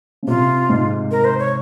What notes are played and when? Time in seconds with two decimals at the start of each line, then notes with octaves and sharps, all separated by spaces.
0.23 C#3
0.27 C3 F4
0.69 G#2
1.11 A#4
1.25 C5
1.39 C#5